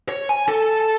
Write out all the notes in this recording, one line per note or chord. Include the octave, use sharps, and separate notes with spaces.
C#5
G#5
A4